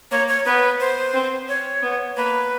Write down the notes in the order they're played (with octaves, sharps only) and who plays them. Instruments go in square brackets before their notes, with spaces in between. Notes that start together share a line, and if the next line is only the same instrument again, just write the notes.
[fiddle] A#3 [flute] C#5
[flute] C#5
[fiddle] B3 [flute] B4
[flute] C5
[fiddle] C4
[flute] C#5
[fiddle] B3
[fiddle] A#3 [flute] B4